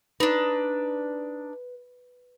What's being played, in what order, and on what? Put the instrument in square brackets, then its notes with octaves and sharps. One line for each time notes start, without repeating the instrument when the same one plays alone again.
[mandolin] D4 D#4 [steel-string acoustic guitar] B4